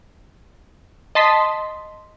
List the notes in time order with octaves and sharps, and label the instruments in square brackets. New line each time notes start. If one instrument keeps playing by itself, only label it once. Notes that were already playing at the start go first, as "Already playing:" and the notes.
[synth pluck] D#5 A5 C6 B6